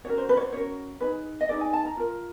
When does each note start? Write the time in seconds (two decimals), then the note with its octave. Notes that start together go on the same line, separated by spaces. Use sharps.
0.05 C#4 F#4 A#4 C#5
0.18 C5
0.29 B4
0.37 C#5
0.41 C5
0.53 C#4 F#4 A#4 C#5
1.00 D#4 G#4 B4
1.41 D#5
1.49 D#4 G#4 B4 D5
1.61 G#5
1.73 A5
1.85 A#5
1.97 F4 A#4